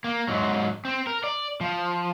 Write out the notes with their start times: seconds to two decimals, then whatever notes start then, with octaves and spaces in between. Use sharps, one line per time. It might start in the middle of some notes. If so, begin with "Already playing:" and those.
0.04 A#3
0.28 G#2 F#3
0.85 C4
1.07 A#4
1.24 D5
1.61 F3